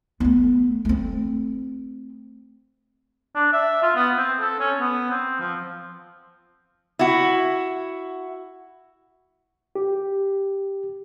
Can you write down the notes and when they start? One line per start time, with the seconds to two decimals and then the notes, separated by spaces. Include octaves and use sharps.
0.20 A3 B3
0.85 A3 C4
3.35 D4
3.53 E5
3.83 F4
3.96 B3
4.17 C4
4.40 A4
4.59 C#4
4.80 B3
5.10 C4
5.40 F3
6.99 E4 F#4
9.75 G4